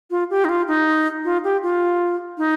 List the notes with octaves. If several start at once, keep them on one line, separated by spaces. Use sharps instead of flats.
F4
G4
D#4
F4
D#4
F4
G4
F4
D#4